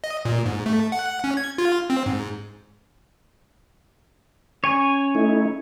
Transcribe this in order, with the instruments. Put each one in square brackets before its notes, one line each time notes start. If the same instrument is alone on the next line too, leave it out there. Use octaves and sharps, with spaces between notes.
[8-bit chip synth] D#5
A#2
G#2
A3
F#5
C#4
G#6
F4
C4
G#2
[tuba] C#4 [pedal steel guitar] C#5 G#5
[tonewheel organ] A3 D#4 E4